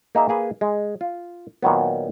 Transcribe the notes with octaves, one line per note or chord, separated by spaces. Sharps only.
A#3 D#4 G#4 E5
A#3 G#4 B4
G#3
F4
A#2 D#3 F#3 B3